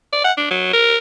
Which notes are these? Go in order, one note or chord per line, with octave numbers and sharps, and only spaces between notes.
D5
F#5
D4
F#3
A#4